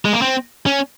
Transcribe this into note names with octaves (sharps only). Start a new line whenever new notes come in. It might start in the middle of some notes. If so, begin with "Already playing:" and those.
G#3
A#3
C4
C#4